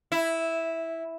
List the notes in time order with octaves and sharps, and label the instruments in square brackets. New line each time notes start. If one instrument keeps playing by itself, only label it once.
[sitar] E4